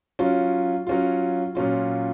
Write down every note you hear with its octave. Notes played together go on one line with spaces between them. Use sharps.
F#3 C#4 F4
F#3 C#4 F4
A#2 F#3 C#4 F4